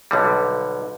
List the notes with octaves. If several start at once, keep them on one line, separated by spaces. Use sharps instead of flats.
B1 D3 G3